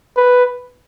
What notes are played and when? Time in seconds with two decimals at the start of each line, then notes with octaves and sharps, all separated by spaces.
0.17 B4